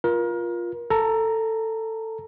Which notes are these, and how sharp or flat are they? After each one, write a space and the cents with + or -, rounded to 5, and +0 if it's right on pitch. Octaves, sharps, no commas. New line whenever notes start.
F4 +0 A#4 +30
A4 +15 A#5 +0